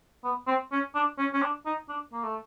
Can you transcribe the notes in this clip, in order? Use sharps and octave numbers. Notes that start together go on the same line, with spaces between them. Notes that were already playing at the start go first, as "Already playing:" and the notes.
B3
C4
C#4
D4
C#4
C#4
D4
D#4
D4
A#3
A3